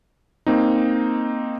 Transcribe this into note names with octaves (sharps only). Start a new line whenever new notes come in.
A#3 C4 D#4